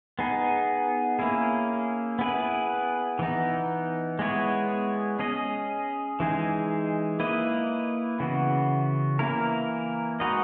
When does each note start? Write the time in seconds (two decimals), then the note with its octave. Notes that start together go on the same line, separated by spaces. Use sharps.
0.19 B3 D#4 G#4
1.19 A#3 C#4 E4 G#4
2.19 B3 E4 G#4 B4
3.19 E3 B3 D#4
4.19 G#3 B3 E4 G#4 C#5
5.19 C#4 G#4 D#5
6.20 E3 G#3 D#4 G#4
7.20 A#3 E4 B4 D#5
8.20 C#3 E3 B3 F#4
9.19 E3 A#3 E4 A#4
10.20 G#3 D#4 F#4 B4 D#5